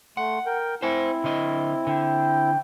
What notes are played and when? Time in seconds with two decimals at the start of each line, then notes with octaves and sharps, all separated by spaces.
0.17 A3 F#5 C6
0.46 A#4 G5
0.82 C4 E4 C5 G#5
1.24 D3 D#5
1.87 D3 G5